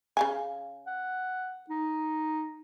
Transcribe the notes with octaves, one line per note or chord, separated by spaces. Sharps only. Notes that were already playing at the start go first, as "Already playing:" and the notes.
C#3 F5 G#5
F#5
D#4